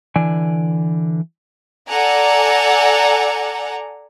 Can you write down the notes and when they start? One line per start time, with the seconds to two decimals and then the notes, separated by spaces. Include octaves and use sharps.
0.16 D3 E3 D5 G#5
1.89 A4 D5 F#5 G#5 A#5